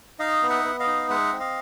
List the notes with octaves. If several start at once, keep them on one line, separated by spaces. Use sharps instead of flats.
D#4 D#5 F5
B3
E5 F#5
B3
D#5 F5
D#4
G#3 E5 F#5
C4
D#5 F5